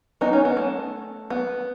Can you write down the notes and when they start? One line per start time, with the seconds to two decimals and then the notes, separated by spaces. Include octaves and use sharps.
0.21 B3 D#4
0.33 C#4
0.45 B3
0.57 A3
1.30 B3